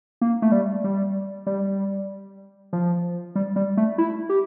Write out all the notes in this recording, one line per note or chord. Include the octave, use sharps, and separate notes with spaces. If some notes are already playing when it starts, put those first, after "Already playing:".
A#3
A3
G3
G3
G3
F3
G3
G3
A3
E4
G4